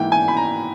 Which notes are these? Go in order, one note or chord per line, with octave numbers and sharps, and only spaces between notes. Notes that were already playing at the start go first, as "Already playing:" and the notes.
Already playing: G#2 E3 A#3 G5
G#5
B5
A#5